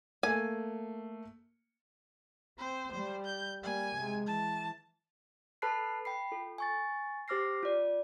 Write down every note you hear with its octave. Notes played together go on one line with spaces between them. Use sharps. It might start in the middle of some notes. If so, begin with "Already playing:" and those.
A3 A#3 G#5
C4 C5
G3 C5
G6
G3 A#3 G#5
C3 G#3
E3 A5
A4 B4 A5 B5 F#6 C7
G5 B5 C7
F4 A4
G#5 C#6 A6
G4 C5 D6 F6 A#6 C7
F4 D5